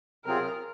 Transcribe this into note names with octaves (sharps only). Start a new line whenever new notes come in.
C3 F#3 C4 F4 G#4 A#4